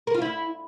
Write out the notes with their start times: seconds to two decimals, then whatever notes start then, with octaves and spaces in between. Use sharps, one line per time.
0.07 A#4
0.14 F4
0.22 E4